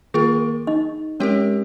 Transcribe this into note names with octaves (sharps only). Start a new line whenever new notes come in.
D#3 A#3 F4 G#4 A#4
D#4 D#5
G#3 C4 C#4 G4 A#4 C#5